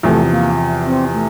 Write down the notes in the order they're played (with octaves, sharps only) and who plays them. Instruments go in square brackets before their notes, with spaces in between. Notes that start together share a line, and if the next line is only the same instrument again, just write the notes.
[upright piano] E2 C3 F3 [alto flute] A3
[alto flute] A#3
C4
A3